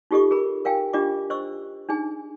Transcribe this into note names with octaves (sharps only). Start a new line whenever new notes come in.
D#4 F4 G4 A4 D#5 C#6
G#4 A#4 B5
A#4 F5 G5 G#5
D4 F4 G4 D#5 D6
C5 D#5 C#6 E6
D4 D#4 G#4 G#5